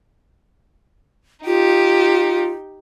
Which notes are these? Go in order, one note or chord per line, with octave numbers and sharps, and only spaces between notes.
D#4 F4 G4